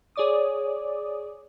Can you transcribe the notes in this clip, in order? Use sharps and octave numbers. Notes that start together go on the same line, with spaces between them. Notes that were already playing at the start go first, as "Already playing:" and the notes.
G#4 C#5 D5 D6 D#6